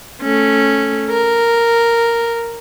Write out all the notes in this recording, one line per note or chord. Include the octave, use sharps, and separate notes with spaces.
A3 C#4
A#4